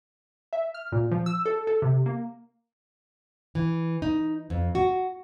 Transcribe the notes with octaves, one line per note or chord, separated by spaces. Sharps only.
E5
F6
A#2
F3
E6
A4
A4
C3
A#3
E3
D#4
F2
F#4